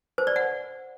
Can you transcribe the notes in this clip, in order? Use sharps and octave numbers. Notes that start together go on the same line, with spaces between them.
C5
D5
F#5